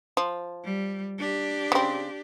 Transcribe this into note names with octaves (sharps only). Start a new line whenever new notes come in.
F3
G3
D4 G4
C#3 C4